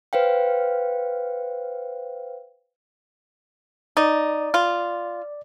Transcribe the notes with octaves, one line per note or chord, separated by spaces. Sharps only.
B4 C5 F5 G5
D#4 D5
F4